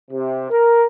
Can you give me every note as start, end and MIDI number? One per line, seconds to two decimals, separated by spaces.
0.11 0.50 48
0.50 0.84 70